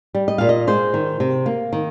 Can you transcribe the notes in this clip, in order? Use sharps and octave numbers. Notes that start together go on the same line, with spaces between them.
G3
D#5
A#2 F5
D#5
G#3 C5
D#3
C3
A#3
D#3